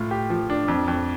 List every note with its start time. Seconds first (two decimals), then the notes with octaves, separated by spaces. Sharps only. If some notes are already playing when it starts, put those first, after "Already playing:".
Already playing: A2 F4
0.11 G4
0.30 F3
0.50 D4
0.68 F2
0.88 F2